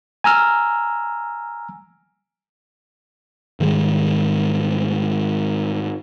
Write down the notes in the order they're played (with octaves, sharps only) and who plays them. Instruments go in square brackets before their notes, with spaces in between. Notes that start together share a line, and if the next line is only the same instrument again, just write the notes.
[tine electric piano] G#5 A#5 E6 F6
[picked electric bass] G#2 D#3 G3 G#3